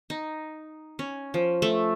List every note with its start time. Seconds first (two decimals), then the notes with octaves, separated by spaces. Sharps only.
0.10 D#4
0.99 C#4
1.34 F3
1.62 A3